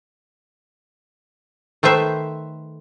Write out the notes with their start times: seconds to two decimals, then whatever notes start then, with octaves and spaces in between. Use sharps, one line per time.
1.83 D#3 A3 B4 C5 E5